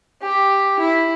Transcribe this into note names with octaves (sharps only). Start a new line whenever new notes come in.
G4
E4